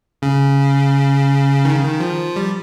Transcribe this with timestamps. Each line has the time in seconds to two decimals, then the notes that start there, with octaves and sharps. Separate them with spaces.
0.22 C#3
1.65 D#3
1.74 C#3
1.84 D#3
2.00 F3
2.36 G3